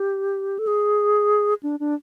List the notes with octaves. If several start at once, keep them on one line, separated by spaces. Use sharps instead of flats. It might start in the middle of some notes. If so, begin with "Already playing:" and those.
Already playing: G4
A4
G#4
D4
D4